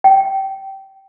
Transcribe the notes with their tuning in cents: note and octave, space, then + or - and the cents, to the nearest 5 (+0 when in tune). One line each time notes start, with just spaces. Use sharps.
G5 -20